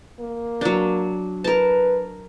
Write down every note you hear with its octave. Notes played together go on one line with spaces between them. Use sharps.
A#3
F#3 D4
A#4 B4 A5